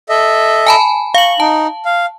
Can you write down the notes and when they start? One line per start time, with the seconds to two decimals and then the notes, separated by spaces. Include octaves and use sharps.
0.09 A4 D#5 E5
0.67 G#5 A5 B5
1.14 F5 C#6 F#7
1.40 D#4 A5
1.85 F5